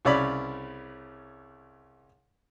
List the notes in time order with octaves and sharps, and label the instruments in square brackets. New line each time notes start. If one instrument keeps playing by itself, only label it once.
[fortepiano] C2 C#3 C#5 D5 B5